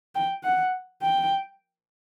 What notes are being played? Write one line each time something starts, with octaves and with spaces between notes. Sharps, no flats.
G5
F#5
G5